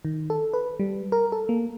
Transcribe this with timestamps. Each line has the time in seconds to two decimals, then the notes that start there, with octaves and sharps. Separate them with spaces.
0.05 D#3
0.30 A4
0.54 B4
0.79 G3
1.12 A#4
1.32 A4
1.49 A#3